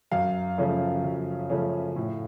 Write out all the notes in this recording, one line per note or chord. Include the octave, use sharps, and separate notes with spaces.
F#2 F5
C#3 F3 A3 C#4
F#2
C#3 F3 A3 C#4
A2